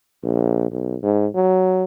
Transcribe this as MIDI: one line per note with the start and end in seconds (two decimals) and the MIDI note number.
0.24 0.68 34
0.71 0.96 35
1.03 1.27 44
1.34 1.84 54